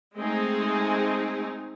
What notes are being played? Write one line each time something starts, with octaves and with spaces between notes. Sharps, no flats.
G#3 A3 C4 D#4 G#4